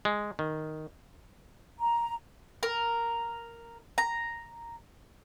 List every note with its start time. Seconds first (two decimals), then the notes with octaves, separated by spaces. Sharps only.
0.05 G#3
0.39 D#3
1.79 A#5
2.63 A#4
3.98 A#5